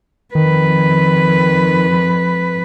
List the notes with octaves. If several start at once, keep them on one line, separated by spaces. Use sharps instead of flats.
F2 D#3 B4